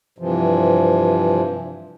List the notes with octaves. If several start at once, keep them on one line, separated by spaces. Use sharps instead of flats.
G2 C3 E3 F3